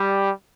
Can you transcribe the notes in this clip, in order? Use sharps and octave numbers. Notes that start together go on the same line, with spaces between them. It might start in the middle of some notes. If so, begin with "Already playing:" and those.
Already playing: G3